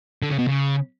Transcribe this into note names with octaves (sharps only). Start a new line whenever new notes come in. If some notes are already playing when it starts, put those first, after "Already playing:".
D3
C#3
B2
C#3